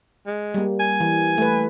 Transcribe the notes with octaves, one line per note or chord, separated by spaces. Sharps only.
G#3
G3 A#3
G#5
E3
A3 B4